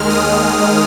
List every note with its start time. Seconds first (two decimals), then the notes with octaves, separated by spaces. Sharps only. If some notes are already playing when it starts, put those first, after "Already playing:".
Already playing: D#2 D#3 G#3 F6
0.10 D#6